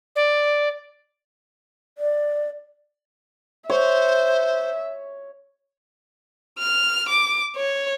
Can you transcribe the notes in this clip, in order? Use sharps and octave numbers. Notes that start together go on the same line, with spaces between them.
D5
D5
C5 C#5 E5
F6
D6
C#5